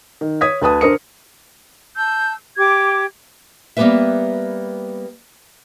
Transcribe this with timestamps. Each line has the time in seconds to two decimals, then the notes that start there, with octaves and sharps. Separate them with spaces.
0.21 D#3
0.41 C#5 D#6 G#6 B6
0.62 D2 B4 A5 D#6
0.81 D3 D4 A#4 C5 D#6 C#7
1.96 A5 E6 G6
2.57 G4 D6 G#6
3.77 G3 A#3 B3 G4 B4 E5